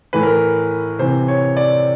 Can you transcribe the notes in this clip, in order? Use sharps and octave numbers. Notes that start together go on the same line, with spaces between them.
A2 E3 B4
A#4
B4
C3 E3 C5
C#5
D5